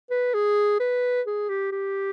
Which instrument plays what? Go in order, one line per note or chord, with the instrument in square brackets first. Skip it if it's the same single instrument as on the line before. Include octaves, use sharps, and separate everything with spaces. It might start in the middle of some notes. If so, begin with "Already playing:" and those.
[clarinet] B4
G#4
B4
G#4
G4
G4